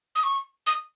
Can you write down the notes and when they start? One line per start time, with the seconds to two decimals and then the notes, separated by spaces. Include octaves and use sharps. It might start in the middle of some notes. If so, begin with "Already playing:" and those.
0.15 D#6
0.23 C#6
0.67 D#6